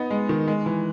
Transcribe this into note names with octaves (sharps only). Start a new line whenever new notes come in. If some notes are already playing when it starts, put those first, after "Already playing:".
Already playing: B3 D#4
G#3
D#3
G#3
E3